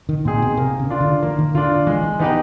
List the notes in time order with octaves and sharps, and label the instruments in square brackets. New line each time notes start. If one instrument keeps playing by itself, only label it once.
[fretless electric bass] D#3
[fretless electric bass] A#2 [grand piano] C4 D#4 G#4
[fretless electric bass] B2
[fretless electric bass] C3 [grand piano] A#3
[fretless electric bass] C#3
[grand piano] D4 F4
[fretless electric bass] D3
[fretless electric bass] D#3 [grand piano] A#3
[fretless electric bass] D#3
[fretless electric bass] D3 [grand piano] D4 F4
[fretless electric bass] D3
[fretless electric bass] E3 [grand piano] G#3
[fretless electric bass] E3
[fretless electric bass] E3 [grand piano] B3 D#4 G4 B4